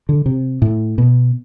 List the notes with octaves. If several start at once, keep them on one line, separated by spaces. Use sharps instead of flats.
D3
C3
A2
B2